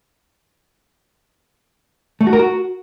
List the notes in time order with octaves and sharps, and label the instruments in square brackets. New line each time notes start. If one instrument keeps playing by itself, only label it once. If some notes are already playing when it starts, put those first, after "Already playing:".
[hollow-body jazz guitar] A3
F#4
A#4
F#4